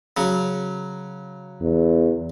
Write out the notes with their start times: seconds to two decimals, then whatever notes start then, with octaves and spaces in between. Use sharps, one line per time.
0.17 C#3 F#3
1.61 E2